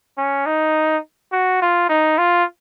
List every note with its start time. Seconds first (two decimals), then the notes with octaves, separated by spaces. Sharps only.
0.18 C#4
0.46 D#4
1.32 F#4
1.62 F4
1.89 D#4
2.18 F4